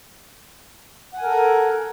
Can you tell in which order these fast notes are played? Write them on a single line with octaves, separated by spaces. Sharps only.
F#5 G#5 A#4 A4 A#5